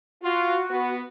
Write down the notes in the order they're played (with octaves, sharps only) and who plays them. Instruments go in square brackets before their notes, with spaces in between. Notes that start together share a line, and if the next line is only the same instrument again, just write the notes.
[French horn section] F4 [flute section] F#4
[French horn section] B3